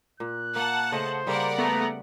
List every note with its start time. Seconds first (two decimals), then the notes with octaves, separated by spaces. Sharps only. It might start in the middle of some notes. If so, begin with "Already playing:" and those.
0.20 A#2 F#6
0.56 A#3 F#5 A5
0.92 C#3 A3 C5 D#5
1.27 C#3 G3 A#3 A#4 D5 F#5
1.58 A3 B3 A#5